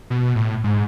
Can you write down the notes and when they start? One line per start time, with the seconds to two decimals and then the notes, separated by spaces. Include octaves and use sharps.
0.10 B2
0.35 A2
0.64 G#2